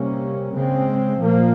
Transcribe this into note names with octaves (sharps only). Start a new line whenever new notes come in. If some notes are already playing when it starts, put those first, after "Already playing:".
Already playing: C3 G3 A#3 C#4
C#3 G#3 C4
A#2 F3 A#3